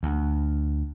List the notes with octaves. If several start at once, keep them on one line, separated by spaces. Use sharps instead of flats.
D2